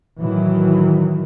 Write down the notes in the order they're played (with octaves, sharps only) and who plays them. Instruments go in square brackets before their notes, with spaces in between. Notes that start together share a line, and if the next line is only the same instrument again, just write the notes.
[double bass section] A2 D#3 E3 F#3